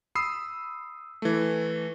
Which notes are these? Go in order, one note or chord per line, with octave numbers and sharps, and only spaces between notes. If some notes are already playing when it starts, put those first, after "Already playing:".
B5 D#6 E6 C7
E3 A3